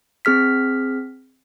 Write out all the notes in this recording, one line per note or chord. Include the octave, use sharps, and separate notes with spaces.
C4 G#4 F6 B6